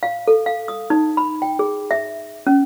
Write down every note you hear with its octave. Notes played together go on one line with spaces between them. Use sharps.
F5
A4
F5
D#6
D#4
B5
G5
G#4
E5
C#4